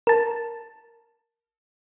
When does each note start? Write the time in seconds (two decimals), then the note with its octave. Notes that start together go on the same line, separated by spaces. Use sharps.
0.07 A#4 A5